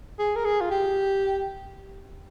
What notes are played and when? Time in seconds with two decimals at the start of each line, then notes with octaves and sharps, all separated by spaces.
0.19 G#4
0.36 A#4
0.45 G#4
0.61 F4
0.71 G4